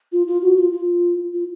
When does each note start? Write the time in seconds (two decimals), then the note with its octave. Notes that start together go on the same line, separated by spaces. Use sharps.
0.12 F4
0.27 F4
0.42 F#4
0.57 F4
0.73 F4
1.33 F4